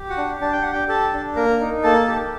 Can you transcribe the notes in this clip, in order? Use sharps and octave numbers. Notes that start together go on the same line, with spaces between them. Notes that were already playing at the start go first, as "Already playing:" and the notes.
Already playing: G4
F#4 F#5
D4
D4 A5
G5
G4 F#5
G4 G5
G4 A4 A5
D4
A#3 A#4 A#5
D#4
A#3 A4 A5
G4